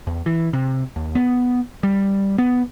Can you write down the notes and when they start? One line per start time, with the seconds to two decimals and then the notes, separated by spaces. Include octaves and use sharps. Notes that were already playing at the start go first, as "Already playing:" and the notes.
0.07 E2
0.26 E3
0.53 C3
0.96 D#2
1.15 B3
1.83 G3
2.38 B3